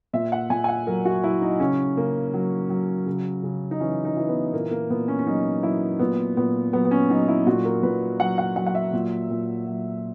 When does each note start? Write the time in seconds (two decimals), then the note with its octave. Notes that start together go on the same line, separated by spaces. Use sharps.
0.13 A#2 E5
0.32 F#5
0.50 A#2 G#5
0.64 G#5
0.69 F#5
0.87 F#3 A#4
1.05 F#4
1.23 F#3 E4
1.42 D#4
1.60 C#3 C#4
1.97 C#3 A#3
2.34 F#3
2.70 F#3
3.06 C#3
3.43 C#3
3.71 D#4
3.80 E3 C#4
4.05 D#4
4.17 E3
4.29 B3
4.53 A#2 A#3
4.71 A#3
4.90 A#2 B3
5.08 C#4
5.19 C#4
5.26 F#3 D#4
5.63 F#3 E4
5.99 A#2 B3
6.37 A#2 B3
6.73 F#3 B3
6.85 B3
6.91 C#4
7.10 F#3 D#4
7.28 E4
7.47 A#2 F#4
7.65 A#4
7.83 A#2 B4
8.20 F#3 F#5
8.38 F#5
8.56 F#3 F#5
8.66 F#5
8.75 E5
8.93 A#2
9.30 A#2
9.67 F#3